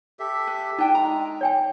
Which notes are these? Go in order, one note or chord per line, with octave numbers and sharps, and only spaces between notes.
G4 A4 E5
B4
D4 D#4 G5 G#5
G#3 A#5
C#5 G5 G#5